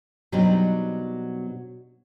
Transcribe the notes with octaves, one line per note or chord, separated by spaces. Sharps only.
B2 F#3 G3 C4 D4 D#4